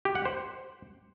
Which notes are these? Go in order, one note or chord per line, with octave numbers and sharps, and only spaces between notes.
G4
F#5
C5